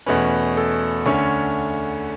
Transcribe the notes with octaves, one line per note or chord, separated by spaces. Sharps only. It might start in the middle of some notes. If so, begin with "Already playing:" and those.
E2 B2 A3 C#4 B4
A4
D2 D3 A3 C#4 C#5